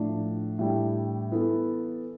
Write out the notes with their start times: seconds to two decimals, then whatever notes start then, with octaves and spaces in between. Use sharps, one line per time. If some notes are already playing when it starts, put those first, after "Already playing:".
Already playing: A2 F3 A3 D4
0.59 A2 E3 G3 D4 G4
1.32 E3 B3 E4 A4